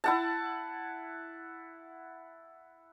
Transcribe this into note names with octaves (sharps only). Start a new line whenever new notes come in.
E4 F#5 A5